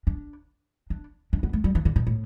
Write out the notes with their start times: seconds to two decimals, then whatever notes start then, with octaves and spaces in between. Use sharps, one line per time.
0.07 D4
0.90 D4
1.33 D4
1.43 B3
1.53 A3
1.64 G3
1.75 E3
1.85 D3
1.96 B2
2.07 A2